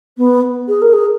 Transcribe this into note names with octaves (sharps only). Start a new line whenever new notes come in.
B3
G#4
A#4
G#4